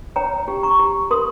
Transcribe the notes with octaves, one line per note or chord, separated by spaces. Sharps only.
C#5 G5 A#5
G4
A#5 C#6
G4
A#4 C6 D#6